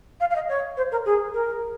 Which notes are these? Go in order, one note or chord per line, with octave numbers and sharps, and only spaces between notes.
F5
F5
D#5
C#5
C5
A#4
G#4
A#4